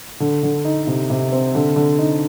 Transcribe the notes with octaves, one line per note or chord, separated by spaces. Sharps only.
D3
D3
D#4
C3
C3
C4
D3
D3
D#4